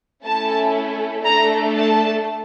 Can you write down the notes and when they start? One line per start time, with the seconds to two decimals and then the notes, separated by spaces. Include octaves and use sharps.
0.24 A3 C#4 E4 A4 A5
1.25 A3 D4 A4 A#5
1.75 A5